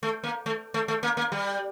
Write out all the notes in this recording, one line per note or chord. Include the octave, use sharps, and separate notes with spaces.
A3
A#3
A3
A3
A3
A#3
A#3
G3